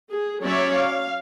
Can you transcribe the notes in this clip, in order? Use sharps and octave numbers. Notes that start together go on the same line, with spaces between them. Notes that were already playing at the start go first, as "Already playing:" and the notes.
G#4
F#3 C#4 C#5 D5 E5
F5